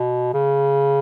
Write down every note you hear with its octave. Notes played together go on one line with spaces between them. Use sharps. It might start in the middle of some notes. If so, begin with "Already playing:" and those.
Already playing: B2
C#3